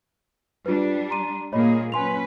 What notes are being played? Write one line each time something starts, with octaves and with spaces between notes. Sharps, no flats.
G3 D4 F4 B4
A#5 C6 D#7
A#2 A#3 G#4 C#5 D#5 B5
F#3 C#4 B4 G#5 C6 F7